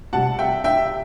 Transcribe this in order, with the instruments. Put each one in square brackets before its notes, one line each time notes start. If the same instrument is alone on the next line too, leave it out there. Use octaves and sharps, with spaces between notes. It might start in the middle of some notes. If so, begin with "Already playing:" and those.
[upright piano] C3 G3 F#5 A5
E5 G5
E5 G5